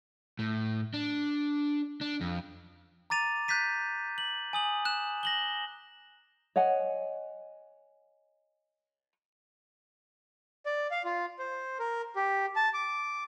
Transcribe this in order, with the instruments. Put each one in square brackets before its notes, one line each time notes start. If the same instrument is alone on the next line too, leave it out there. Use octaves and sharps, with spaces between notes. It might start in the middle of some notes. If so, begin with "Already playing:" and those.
[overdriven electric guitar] A2
D4
D4
F2
[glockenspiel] A#5 D6 A6 D#7 F7
F#6 G6 A6 B6 D#7
F#7
G#5 D#6 F#7
F#6 E7
A#6 F#7 G7
[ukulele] C#5 D#5 F#5 G#5
[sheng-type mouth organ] D5
F5
F4
C5
A#4
G4
A5
D6